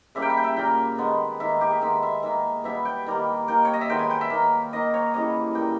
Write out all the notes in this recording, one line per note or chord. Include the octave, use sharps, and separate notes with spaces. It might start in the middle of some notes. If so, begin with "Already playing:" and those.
C#3 G3 A#3 E5
G5
E5
G5
E5
A#2 A#3 G5
D#3 G#3 B3
D#3 A#3 E5
G4
G#4
D#3 G#3 B3 E5
E5
D#3 A#3 E5
B2 G3 B3 E5
G5
D#3 G3 A#3
D#3 A#3 G5
C#5
D#5
E5
D#3 G#3 B3 G5
G#5
G5
E5
D#3 A#3
D#3 A#3 D#5
C#5
C#3 E3 G3 D#5
A#2 A#3 G5